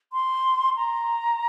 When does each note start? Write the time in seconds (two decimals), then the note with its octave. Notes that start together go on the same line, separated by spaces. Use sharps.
0.13 C6
0.76 A#5